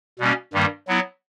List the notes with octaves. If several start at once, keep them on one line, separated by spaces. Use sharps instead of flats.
B2 G3 A#3 C#4
G2 D#3 G3 A#3
F#3 B3 E4